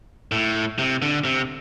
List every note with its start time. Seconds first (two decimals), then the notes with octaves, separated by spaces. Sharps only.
0.32 A2
0.79 C3
1.02 D3
1.25 C3